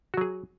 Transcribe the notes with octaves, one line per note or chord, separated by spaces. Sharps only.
F#3 F#4 G#4